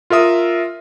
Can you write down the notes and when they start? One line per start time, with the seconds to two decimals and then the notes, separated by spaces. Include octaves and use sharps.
0.10 F4 A#4 E5 D#6